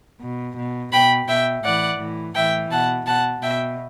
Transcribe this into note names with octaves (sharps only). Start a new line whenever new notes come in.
B2
B2
B2 G5 B5
B2 E5 G5
A2 E3 D5 F#5
A2 E3
A2 E3 E5 G5
B2 F#5 A5
B2 F#5 A5
B2 E5 G5